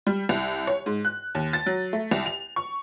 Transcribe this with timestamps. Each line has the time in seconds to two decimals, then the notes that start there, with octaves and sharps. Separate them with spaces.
0.07 G3
0.29 C2
0.67 C#5
0.86 G#2
1.05 F#6
1.35 D#2
1.53 A6
1.66 F#3
1.93 A3
2.11 C2
2.26 F7
2.56 C#6